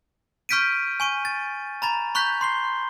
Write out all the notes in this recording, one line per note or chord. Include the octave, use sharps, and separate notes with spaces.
C#6 F6 G6 B6 D7 D#7
G#5 C#6 D#7
A6
A#5 B5 A6
B5 C#6 F#6 G6 B6
C6 C7 G7